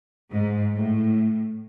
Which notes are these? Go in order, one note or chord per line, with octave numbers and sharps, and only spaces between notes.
G#2
A2